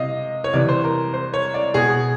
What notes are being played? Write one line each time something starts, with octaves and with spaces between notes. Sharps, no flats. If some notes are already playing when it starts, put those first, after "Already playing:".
Already playing: C3 D#5 F5
C#5
C3 E3 D5
C5
A#4
C5
C#5
D5
B2 G#4